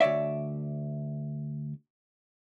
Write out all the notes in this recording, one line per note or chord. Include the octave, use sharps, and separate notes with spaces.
D2 G2 C#5 D5 E5